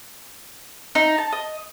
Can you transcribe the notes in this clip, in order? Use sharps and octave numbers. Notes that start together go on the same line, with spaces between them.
D#4
A5
D#5